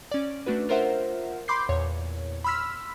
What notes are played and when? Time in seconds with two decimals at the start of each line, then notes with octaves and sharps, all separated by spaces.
0.11 C#4 D5
0.46 A3 D4 F#4 B4
0.69 F4 A#4 C5 E5 F#5
1.48 B5 C6 D6 G6 C7
1.69 E2 A#2 C#5
2.44 B5 C6 E6 F6 B6